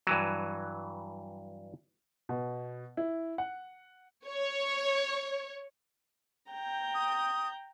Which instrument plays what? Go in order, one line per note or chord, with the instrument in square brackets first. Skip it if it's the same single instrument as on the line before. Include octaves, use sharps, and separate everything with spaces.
[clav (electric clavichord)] G2 E3 F#3
[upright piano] B2
E4
F#5
[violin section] C#5
[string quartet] G5 A#5 G6
[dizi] D#6